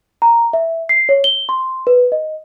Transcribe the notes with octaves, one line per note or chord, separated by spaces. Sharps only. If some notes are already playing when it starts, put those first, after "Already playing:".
A#5
E5
C7
C#5
G7
C6
B4
D#5